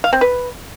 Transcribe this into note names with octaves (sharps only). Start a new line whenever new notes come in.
F5
C4
B4